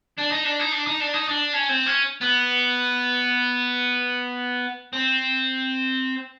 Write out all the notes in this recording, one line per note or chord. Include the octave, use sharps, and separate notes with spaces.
D4
D#4
D4
D#4
D4
D#4
D4
D#4
D4
C#4
C4
C#4
B3
C4